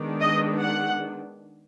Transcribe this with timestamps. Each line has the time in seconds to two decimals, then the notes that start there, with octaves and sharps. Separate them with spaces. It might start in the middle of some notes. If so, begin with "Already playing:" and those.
Already playing: D#3 G#3 B3 D4
0.20 D#5
0.62 F#5